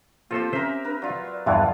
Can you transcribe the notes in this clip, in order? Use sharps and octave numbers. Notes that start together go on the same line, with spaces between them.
A#3 C4 F4 G4 A4 C5
C#4 A#4 C5 E5
D4 A#4 B4
F#3 F4 D5
E2 G2 E3 G#3 F4 F5